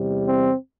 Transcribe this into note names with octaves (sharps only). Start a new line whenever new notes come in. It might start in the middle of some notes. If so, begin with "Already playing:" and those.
Already playing: E2 C3 G3
C4